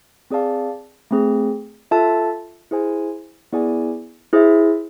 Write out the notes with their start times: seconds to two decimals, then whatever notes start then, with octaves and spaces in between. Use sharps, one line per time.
0.31 C4 G#4 D5 F5 A5
1.11 A3 C4 G#4
1.91 F4 A4 E5 A5
2.71 E4 G#4 C5 G#5
3.53 B3 E4 G#4 D5 G#5
4.33 E4 G#4 C5 E5